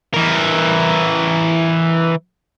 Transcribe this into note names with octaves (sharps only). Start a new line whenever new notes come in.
E3 A#4